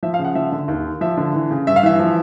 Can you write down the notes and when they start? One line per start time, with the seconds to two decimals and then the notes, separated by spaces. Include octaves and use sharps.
0.03 F3 E5
0.14 F5
0.19 C#3
0.25 F#5
0.35 F3 E5
0.52 D3
0.68 D#2
0.84 D#3
1.01 F3 E5
1.17 D3
1.34 E3
1.51 C#3
1.67 G2 E5
1.76 F5
1.83 E3 E5
1.99 F3